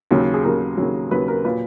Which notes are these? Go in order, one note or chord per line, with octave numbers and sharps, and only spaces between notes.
D#2 C#3 F#3
G#4
D#2 C#3 F#3 A#4
D#2 C#3 F#3
D#2 C#3 F#3 B4
A#4
A#2 F#3 A#3 B4